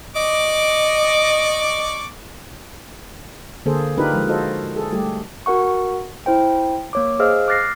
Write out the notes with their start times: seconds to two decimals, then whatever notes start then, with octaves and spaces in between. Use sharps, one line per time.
0.16 D5 D#5 C#6 D6
3.66 D3 A#3 G#4 A4 C5
3.97 D4 D#4 F4 G4 A#4 B4
4.13 F3 G#3
4.28 F4 F#4 A4 C5 D#5
4.76 G#4 A4
4.92 G3 A3 G4
5.46 F#4 A#4 F#5 C#6
6.26 E4 C5 G5
6.93 A#3 C#5 D6
7.19 G#4 C5 D#5 F5 E6 F6
7.48 D6 F6 F#6 A6 A#6 C7